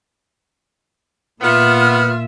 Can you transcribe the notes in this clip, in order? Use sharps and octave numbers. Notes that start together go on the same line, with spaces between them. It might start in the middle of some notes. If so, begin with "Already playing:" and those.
A#2 B3 F4 E5 F6